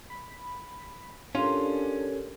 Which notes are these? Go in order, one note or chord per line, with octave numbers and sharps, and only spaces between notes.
B5
C#4 D4 F4 G4 A4 A#4